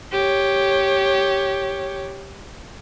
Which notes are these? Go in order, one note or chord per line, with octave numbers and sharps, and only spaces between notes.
G4 C#5